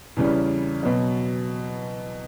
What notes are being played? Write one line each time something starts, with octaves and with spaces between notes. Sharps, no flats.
E2 C#3 E3 G3 C#4
B2 F#3 B3